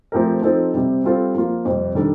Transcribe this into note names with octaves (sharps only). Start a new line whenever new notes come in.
F3 A3 C4 G4 A#4
F3 C4 D#4 A4
C3 G3 C4
G3 C4 F4 A4
F3 A#3 F4
F2 C3 G3
D#3 G3 D4 A4